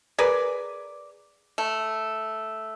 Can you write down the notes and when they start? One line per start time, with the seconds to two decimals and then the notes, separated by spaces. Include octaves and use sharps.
0.18 G#4 A#4 B4 D5
1.58 A3